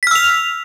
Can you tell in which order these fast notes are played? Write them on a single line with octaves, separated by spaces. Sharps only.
B6 F6 E6 F7